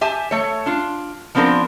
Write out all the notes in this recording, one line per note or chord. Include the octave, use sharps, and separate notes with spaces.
G4 E5 G#5 A5
A3 C#5
D4 F4
F3 B3 C4 D4 A#4